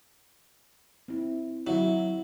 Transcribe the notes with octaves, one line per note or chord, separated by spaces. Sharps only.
C4 E4
F#3 E4 E5